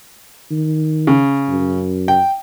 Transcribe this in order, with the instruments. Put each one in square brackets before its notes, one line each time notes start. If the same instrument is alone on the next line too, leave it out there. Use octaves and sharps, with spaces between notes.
[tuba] D#3
[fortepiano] C#3
[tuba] F#2
[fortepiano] G5